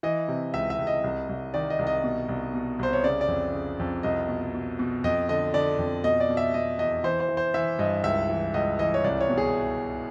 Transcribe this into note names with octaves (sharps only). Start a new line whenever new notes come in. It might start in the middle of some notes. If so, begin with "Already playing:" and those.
E3 D#5
C3
C#2 E5
E5
C#2
D#5
C2
C2
D#3 D5
D#5
C2
D#5
B2
C2
B2
C2 C5
C#5
C#3 D5
D5
F2
C#3
F2
C2 D#5
B2
B2
B2
F2 D#5
D3 D#5
D3 D5
F2
B2 D#5
D5
B2
E5
B2 D#5
E2 D#5
E3 C5
C5
E3
C5
E3 E5
G2 D#5
C#2 E5
E3
C#2 D#5
E3 D#5
C#5
C2 D5
C#5
B2
G#4